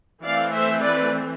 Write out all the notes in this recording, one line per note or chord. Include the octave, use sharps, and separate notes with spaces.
E3 A3 C4 D5 F5
C5 E5
B4 D5